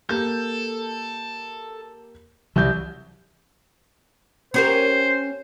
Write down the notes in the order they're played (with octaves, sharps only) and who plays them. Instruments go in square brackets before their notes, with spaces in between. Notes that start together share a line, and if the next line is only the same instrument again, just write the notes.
[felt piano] A#3 G4 G6 [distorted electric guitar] A4
[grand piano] C2 G6 [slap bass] E3 F#3
[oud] C#4 G4 A#4 [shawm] C5